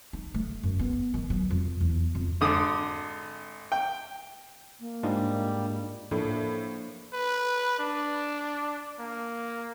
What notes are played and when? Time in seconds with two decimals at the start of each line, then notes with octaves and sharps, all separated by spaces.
0.13 D#4
0.34 A3
0.63 F#2
0.79 B3
1.14 D#3
1.30 F#3
1.50 F2
1.81 E2
2.15 F2
2.41 G#1 D3 D#6
3.72 G5
4.80 A#3
5.03 G#2 G3 D4 F4 D#5
6.11 A2 F3 A#3 D4
7.13 B4
7.79 D4
9.00 A#3